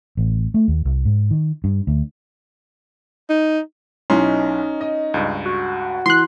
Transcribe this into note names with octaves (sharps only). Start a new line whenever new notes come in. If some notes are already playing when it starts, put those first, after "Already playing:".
A1
A3
D#2
C2
G#2
D#3
G2
D2
D#4
B1 C#4 D#4 E4 C6
D#5
C#2 G2
F#4
E3 C6 F#6